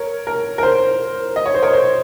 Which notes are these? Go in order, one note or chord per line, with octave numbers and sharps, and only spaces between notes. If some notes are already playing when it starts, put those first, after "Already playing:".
Already playing: A#4 C#5
A#4
A#4
C5
D#5
C#5
C5
A#4 C#5
C5